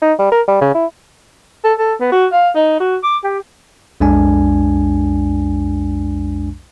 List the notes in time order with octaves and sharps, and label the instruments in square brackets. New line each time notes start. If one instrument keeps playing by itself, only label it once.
[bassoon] D#4
G3
A#4
G3
C#3
E4
[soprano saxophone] A4
A4
B3
F#4
F5
D#4
F#4
D6
G4
[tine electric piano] B1 F2 G#3 D4 G#5